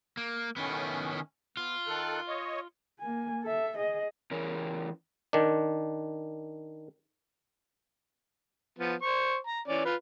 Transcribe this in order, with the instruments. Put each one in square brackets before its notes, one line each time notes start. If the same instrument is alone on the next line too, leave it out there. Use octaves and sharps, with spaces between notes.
[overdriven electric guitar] A#3
[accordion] A2 C#4 [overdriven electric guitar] D#3 B3
[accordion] B3 [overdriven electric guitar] F4
[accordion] D#3 A4 F#6
C#5 D#5
[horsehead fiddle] A#3 G#5
A4 E5
G#4 D#5
[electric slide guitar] E3 C#4 A#4
[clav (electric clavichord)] D#3 D4
[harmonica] F3 B3
C5 C#6
A#5
E3 C#4 D5
F4 B4